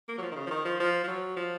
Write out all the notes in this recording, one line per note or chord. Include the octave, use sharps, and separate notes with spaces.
A#3
F#3
F3
D#3
C#3
F3
D#3
F3
F3
F3
F#3
F3